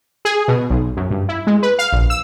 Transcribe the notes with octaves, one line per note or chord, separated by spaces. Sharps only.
G#4
B2
B1
F#2
G2
E4
G#3
B4
F5
A#1
E6